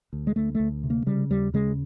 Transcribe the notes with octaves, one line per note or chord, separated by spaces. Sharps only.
D2
G#3
D2 A3
A3
D2
C3
A#3
C#3 G3
D#2 G3
C#3 G#3